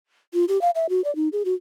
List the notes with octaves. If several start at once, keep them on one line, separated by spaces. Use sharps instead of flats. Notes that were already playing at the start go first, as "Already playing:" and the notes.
F4
G4
F5
E5
F#4
D5
D#4
G#4
F#4